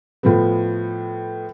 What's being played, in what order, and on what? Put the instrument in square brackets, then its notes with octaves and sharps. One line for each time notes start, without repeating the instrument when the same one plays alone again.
[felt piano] A2 F3 B3